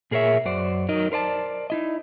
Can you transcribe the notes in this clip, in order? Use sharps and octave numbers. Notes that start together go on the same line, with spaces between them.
A#2 G#4 A#4 C#5 E5
F#2 F#4 C5 D5
F#3 D#4 A#4 D#5
A#4 C5 D5 A5
D#4 E4 D#5